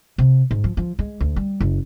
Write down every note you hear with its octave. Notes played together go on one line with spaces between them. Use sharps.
C3
G#2
F3
F3
G#3
D2
G3
F#1